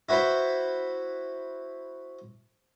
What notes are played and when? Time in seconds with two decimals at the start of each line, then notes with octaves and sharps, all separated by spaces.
0.09 E4 F#4 B4 C5